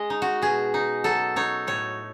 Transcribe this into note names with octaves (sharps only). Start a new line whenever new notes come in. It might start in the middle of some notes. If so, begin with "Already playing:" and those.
Already playing: G#3 D#5
D#4
F#4
B2 G#4
D#4
F#3 A4
D#4 C#5
A2 C#5